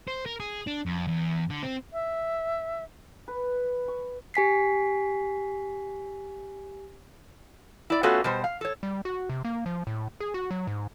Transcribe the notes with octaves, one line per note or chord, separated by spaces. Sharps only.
C5
A#4
G#4
D4
F2
E2
D3
C4
E5
B4
C#6
G4 G#5 B6 C7
E4 D5
A3 B3 C#4 F4 F#4 A4
B2 G3 C5
F5
A4 C#5
G3
F#4
C3
A#3
F3
A2
G#4
F#4
F#3
G#2